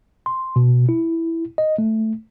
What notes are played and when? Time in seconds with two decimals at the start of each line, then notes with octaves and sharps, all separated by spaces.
0.26 C6
0.56 B2
0.89 E4
1.58 D#5
1.78 A3